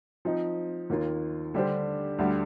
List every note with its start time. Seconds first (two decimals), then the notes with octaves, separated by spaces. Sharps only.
0.25 F3 C4 D#4
0.90 D#2 D#3 A#3 F4
1.54 D3 G3 D4 G4 C5
2.18 D2 D3 G3